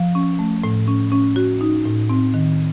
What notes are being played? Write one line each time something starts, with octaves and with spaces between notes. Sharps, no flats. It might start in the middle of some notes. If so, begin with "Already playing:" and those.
Already playing: F3
C#4
A3
A2
C#4
C#4
F#4
D#4
A2
C4
D#3